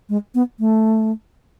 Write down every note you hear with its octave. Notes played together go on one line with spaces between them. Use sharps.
G#3
B3
A3